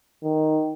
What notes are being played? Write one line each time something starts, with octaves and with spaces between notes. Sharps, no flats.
D#3